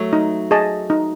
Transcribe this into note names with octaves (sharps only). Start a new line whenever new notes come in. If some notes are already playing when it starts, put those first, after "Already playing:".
Already playing: F#3 A3
D#4
G#4 D#5 A5
D#4